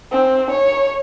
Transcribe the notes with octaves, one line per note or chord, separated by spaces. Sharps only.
C4
C#5